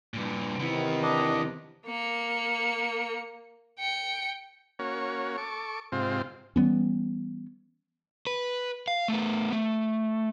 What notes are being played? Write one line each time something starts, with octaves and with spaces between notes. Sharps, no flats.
G2 A#2
C3 D#3 E3 B3
D4 D#5
A#3 C#7
G5 C#7
A#3 C#4 F#4 C#5
A4 C#6 D6
G#2 C3 C4 F4
E3 G3 B3 C#4
B4
F5
A3 B3
A3